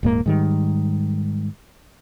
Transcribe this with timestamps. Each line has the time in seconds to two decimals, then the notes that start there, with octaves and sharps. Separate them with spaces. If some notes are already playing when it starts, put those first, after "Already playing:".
0.03 D#1 G#2 A#3
0.26 G#2 D#3 G3